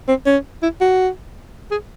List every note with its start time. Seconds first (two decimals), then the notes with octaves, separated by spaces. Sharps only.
0.08 C4
0.26 C#4
0.62 E4
0.81 F#4
1.71 G#4